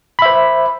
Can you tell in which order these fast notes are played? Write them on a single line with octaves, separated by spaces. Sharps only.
B5 E5 C5